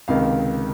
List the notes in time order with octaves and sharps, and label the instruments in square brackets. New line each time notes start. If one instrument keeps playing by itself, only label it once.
[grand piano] C#2 C3 D#3 F5
F5